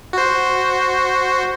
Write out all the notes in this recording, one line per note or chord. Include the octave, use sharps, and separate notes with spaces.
F#4 C5